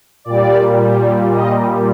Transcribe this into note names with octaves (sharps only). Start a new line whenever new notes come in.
A#2 G3 D5
D#5